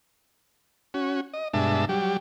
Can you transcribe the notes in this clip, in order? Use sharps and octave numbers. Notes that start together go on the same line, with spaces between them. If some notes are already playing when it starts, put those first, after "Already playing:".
C#4 F#4
D#5
G2 B2 G#3 D4 E5 A5
F#3 G3 G4